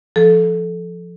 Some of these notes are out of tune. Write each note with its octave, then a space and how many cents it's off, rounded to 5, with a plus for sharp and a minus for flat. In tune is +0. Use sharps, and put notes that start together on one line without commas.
F3 +0 A4 -15